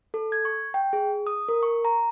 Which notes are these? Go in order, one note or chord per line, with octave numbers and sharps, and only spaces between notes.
A4
G#6
C#6
G5
G#4
D#6
A#4
C#6
A#5